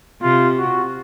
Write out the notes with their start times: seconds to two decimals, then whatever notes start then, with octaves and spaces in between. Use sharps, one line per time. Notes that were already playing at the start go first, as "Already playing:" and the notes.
0.21 C3 F4
0.58 F#4